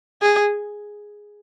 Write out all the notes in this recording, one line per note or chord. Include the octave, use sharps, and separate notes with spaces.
G#4